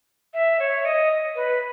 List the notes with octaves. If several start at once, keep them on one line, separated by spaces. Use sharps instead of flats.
E5
C#5
D#5
B4